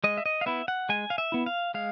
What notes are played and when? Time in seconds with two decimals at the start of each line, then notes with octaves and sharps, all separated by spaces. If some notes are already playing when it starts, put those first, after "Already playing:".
0.04 G#3 D#5
0.17 E5
0.26 D#5
0.41 F5
0.46 B3 E4 E5
0.68 F#5
0.89 G#3 G#5
1.10 F5
1.18 E5
1.32 B3 E4
1.46 F5
1.74 G#3 F5